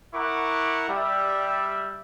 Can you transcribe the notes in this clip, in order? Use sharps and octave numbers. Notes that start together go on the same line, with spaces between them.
E4 A#4 F#5 C#6 D6
G3 E5